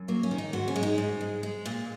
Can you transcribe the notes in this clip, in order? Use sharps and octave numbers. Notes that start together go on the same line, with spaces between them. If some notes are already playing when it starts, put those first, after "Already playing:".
Already playing: F#2
F#3 A#3
C#4
D#3
D#4
G#2 F#4
C#4
G#3
D#4
G#2
G#3
G#3
A#2